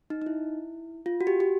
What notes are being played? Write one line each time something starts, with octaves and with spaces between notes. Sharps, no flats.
D#4
D#4
E4
F4
F#4
G4
G4